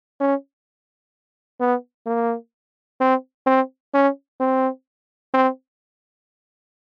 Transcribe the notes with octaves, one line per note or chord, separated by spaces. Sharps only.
C#4
B3
A#3
C4
C4
C#4
C4
C4